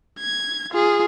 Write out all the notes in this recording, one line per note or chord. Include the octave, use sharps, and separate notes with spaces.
G#6
F4 G#4